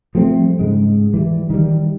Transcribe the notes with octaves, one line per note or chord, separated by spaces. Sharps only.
F3 G3 A3 C4
G#2 C#3 G#3
E3 G3
D#3 G3